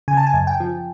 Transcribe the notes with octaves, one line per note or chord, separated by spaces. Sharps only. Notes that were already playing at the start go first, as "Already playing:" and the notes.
C#3 G#5
A5
G#5
F#2
G5
F3